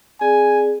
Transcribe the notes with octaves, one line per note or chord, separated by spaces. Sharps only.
C4 G#4 D5 G#5